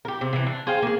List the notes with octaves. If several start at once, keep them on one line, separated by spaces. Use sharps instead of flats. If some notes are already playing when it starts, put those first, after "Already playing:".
G4 A#4
C3
C3 E3
D4
G#4 C5 F5 G5
A#3 G#4